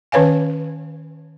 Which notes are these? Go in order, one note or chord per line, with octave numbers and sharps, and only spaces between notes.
D#3 C#4 B4 C#5 F5 G#5